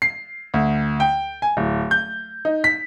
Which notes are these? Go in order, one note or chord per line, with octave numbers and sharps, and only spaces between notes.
C7
D2
G5
G#5
D1
G6
D#4
B6